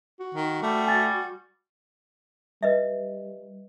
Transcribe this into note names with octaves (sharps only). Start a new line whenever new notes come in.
F#4
D#3
G3 A3
G#5 A6
G3 B4 D#5 E5